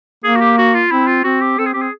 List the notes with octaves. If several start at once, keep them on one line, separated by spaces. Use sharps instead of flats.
A#3 G#4
F#4
G4
F#4
F4
C4 E4
F4
C4 F#4
G4
C4 A4
G#4
C4 G4
G#4